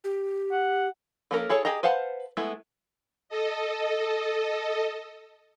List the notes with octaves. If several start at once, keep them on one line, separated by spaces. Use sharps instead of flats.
G4
F#5
F3 A#3 C#4 A4 A#4
E4 G#4 A4 C#5
G4 G#4 D#5 A#5
B4 C5 F5 F#5 A5
G#3 A3 B3 E4
A4 D#5